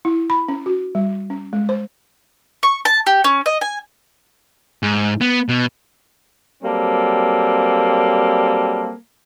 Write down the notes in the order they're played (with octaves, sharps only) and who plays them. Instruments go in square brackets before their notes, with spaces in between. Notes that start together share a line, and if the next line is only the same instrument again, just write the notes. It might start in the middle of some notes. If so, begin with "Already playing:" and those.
[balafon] E4
B5
C#4
F#4
G3
C#4
G#3
C5
[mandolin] C#6
A5
G4
C#4
D#5
G#5
[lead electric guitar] G#2
B3
B2
[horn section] F#3 G3 A#3 C4 A4